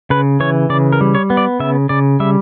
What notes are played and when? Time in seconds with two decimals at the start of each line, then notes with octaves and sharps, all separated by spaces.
0.10 C#3 B4
0.40 E3 C#5
0.70 C#3 D5
0.93 A#4
1.01 G3
1.15 C#5
1.30 B3
1.37 D5
1.60 C#3 E5
1.89 C#3 D5
2.20 G3 E5